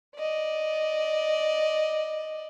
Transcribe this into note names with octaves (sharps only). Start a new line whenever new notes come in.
D5 D#5